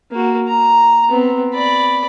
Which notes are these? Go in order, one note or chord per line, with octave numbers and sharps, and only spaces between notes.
A#3 F#4
A#5
B3 C4
D5 B5